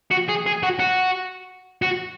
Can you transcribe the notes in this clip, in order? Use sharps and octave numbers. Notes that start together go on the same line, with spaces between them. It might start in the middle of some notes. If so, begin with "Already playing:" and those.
F#4
G#4
G#4
F#4
F#4
F#4